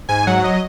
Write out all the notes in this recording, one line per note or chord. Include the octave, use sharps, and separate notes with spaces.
G#2 G#5
F#3 F#5
D#5